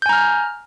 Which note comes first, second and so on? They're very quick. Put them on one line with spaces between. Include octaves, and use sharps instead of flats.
G6 G#5 A#5 F6